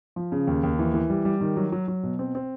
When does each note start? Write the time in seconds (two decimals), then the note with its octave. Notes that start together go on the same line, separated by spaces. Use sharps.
0.16 F3
0.32 C#3
0.47 D#2
0.63 D#2
0.79 E3
0.94 E3
1.10 G3
1.25 G3
1.41 D#3
1.56 F#3
1.72 F#3
1.88 F#3
2.03 B2
2.19 C4
2.35 C4